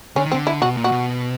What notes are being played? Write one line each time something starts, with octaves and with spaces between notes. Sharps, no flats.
D3 C#4
D#3
C4
D3
E4
B2 F#4
A#2
F#4
B2